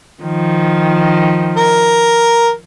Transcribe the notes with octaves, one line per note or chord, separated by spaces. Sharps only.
D#3 F3
A#4